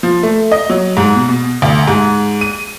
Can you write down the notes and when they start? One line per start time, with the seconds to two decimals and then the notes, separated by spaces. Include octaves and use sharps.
0.03 F3
0.23 A3
0.51 D#5
0.70 F#3
0.97 G#2
1.15 B2
1.29 B2
1.62 D2
1.87 G#2
2.41 D#7